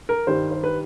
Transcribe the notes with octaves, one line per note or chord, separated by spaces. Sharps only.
A#4
G2 D#3 G3 C5
C5
B4